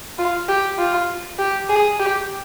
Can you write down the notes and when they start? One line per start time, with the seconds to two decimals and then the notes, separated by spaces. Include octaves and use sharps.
0.19 F4
0.48 G4
0.79 F4
1.39 G4
1.70 G#4
1.99 G4